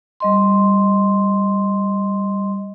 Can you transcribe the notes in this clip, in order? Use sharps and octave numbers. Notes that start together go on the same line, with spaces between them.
G3 D#5 C6